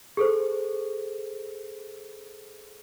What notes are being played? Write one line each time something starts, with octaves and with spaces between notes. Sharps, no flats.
G#4 A4 C5